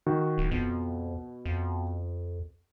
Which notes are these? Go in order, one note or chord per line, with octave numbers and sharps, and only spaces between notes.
D#3 F#4
D1
F2 B2
F2